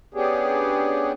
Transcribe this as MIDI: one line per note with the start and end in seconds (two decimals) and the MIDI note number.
0.14 1.12 59
0.14 1.12 61
0.14 1.12 62
0.14 1.12 67
0.14 1.12 68